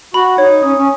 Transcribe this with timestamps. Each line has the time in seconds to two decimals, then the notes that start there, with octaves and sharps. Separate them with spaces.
0.14 F#4 B5
0.38 D#4 C#5
0.63 C#4 D#6
0.76 C#4